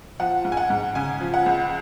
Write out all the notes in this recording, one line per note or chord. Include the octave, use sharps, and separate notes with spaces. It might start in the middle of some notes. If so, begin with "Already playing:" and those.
F3 F#5
G#2
G#5
F#5
G#2
C#3 G#5
F3
F#5
C#2